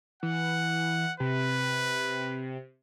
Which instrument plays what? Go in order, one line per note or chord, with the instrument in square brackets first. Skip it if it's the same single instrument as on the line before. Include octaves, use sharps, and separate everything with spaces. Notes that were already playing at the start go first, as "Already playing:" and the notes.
[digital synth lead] E3 [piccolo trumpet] F#5
[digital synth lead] C3 [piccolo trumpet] B4